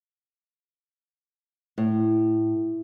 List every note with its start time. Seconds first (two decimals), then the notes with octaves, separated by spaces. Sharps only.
1.78 A2